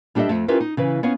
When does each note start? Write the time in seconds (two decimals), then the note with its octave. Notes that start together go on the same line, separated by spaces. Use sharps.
0.15 G3 D4 G4 A4 D#5 E5
0.29 F2 A3
0.48 C#4 E4 F4 G4 A#4 B4
0.60 D#4
0.77 C#3 E3 B4
1.03 B3 C#4 C#5 F5